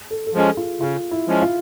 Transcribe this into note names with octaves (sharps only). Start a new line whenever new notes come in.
A4
A4
F3 G#3 C#4 G#4
F4
C#3 F4
E4
F3 G#3 C#4
F4